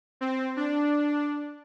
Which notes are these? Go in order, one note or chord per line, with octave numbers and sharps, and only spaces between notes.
C4
D4